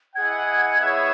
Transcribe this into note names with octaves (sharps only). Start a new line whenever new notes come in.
E4 G#4 D#5 F#5 G#6
B3 E4 G#4 C#5 E5